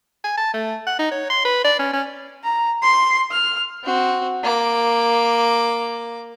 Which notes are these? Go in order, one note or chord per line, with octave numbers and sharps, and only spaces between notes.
G#5
A5
A3
F#5
D#4
C#5
C6
B4
D5
C#4
C#4
A#5
C6
F6
C4 F#4
A#3 D6